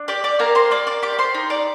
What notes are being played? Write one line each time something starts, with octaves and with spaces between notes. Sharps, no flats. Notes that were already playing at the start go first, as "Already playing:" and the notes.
Already playing: D4
G4 D5 D6
D5 D6
A#3 A#4 A#5
C5 C6
A#3 D5 D6
D5 D6
G4 D5 D6
C5 C6
D#4
D5 D6